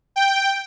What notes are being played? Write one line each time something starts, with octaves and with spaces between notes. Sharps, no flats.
G5